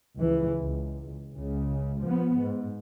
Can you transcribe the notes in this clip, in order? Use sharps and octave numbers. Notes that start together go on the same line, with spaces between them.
C#2 E3
C#2
C#2 C#3
F3 B3
G#2